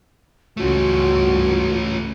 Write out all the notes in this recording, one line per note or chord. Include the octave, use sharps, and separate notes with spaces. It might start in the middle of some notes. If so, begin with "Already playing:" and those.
C#2 G2 A3 C#4 F4 F#4